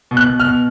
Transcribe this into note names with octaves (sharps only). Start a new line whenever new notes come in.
B2
F#6
B2
F6
B2